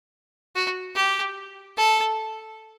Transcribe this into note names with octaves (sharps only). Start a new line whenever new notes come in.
F#4
G4
A4